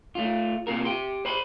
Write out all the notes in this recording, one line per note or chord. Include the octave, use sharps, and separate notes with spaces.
A3 F4
C3 A#3 F4 A#4
G4 G5 C6
C5 B5 C6